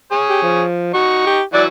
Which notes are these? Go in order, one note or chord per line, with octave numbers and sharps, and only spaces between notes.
G#4 C#5
G4
F3
D#4 F#4 C#6
G4
E3 F#3 F#4 D5